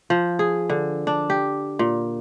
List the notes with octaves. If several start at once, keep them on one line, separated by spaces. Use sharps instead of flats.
F3
G#4
D3
D4
G4
A#2